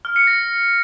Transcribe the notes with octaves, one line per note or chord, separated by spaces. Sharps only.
F6
C#7
A#6